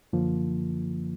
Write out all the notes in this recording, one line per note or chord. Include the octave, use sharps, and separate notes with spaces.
F#2 D3 F3 A#3